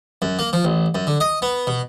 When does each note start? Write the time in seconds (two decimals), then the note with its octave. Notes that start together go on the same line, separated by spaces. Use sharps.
0.22 F#2
0.39 A#3
0.53 F3
0.65 A1
0.95 F#2
1.07 D3
1.21 D#5
1.42 B3
1.67 B2